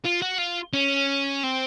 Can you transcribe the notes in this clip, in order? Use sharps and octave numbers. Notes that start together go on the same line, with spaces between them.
F4
F#4
F4
C#4
C4